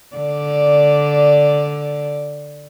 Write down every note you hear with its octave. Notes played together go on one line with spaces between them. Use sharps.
D3 D5